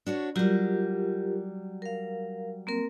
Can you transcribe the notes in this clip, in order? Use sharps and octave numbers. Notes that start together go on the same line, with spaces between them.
D4 F#4 C#5
F#3 G3 F4 G4 A#4
A#4 F5
A#3 C4 A#4